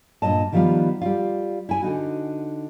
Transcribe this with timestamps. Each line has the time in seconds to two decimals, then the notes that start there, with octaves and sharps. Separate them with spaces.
0.22 G2 A#2 D#5 A5
0.52 D#3 F3 G3 B3 F4
1.01 G3 F4
1.69 E4 G#5
1.83 D3 D#4 F#4